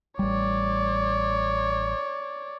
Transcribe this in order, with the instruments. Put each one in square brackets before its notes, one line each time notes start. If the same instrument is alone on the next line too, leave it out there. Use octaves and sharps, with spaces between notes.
[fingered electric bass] A1 G3 [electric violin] C#5 D5